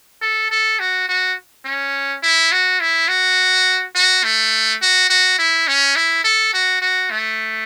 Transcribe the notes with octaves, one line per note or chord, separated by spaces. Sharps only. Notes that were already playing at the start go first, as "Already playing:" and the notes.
A4
A4
F#4
F#4
C#4
E4
F#4
E4
F#4
F#4
A3
F#4
F#4
E4
C#4
E4
A4
F#4
F#4
A3